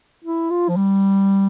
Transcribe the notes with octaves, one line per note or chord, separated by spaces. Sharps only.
E4
F4
F3
G3